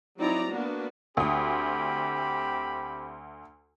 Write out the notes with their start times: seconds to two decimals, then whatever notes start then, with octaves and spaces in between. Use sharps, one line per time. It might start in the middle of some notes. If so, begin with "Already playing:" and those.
0.18 F#3 C4 D#4 E4 D5 A#5
0.49 A#3 B3 D4 F#4
1.17 D2 C4 G4 B5 D#6